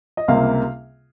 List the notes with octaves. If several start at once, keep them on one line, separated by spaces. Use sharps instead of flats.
D#5
C#2 C3 G3 A#3 F5